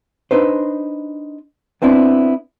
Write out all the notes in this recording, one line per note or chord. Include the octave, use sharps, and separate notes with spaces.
D4 D#4 B4 C5
B3 C4 D4 E4